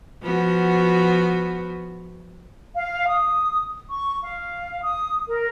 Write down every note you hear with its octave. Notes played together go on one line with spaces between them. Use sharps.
F3 B3 F#4
F5
D#6
C#6
F5
D#6
A#4